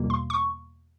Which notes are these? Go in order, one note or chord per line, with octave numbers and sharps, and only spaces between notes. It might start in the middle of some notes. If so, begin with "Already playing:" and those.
Already playing: E2 B2 G3 A#3
C6
C#6